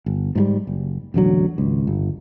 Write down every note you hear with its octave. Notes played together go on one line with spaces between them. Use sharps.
G1
G#2 F3 G3
F#1
E1 A1 D3 F#3
G#1 C#2
G1